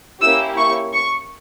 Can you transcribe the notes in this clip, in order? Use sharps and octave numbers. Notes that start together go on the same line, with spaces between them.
A#3 C#4 E4 G4 E6
C#6
C#6